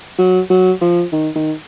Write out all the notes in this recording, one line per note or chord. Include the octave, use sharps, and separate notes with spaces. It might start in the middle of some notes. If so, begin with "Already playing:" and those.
F#3
F#3
F3
D#3
D#3